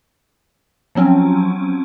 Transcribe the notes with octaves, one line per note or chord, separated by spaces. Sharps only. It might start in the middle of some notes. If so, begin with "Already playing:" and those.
F3 F#3 C4 C#4